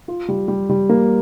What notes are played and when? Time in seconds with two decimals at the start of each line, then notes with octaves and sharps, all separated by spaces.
0.08 F4
0.29 G3
0.48 G3
0.70 G3
0.89 A#3